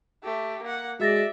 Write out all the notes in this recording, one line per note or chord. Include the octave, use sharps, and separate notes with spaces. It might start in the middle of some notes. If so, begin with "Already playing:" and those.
A3 G4
A#3 F#5
G#3 F#4 D5 E5 A6 A#6